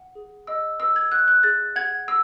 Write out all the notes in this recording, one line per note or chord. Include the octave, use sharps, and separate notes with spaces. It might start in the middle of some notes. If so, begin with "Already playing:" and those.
Already playing: F#5
G#4
D#5 E6
B4 E6
G#6
F#5 F#6
F#6
G#4 A6
F#5 G#6
E6